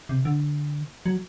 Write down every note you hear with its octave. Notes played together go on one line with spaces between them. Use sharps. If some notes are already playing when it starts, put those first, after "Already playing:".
C3
D3
F#3